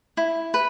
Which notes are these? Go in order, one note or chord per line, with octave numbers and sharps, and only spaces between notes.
E4
B4